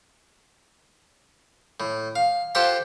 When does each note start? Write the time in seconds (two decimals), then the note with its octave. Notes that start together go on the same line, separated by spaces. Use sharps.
1.80 A2
2.16 F5
2.55 F4 G4 A4 C5 F#5